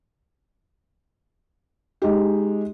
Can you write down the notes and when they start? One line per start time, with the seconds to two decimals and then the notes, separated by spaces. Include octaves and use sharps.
2.02 G#3 D#4 G4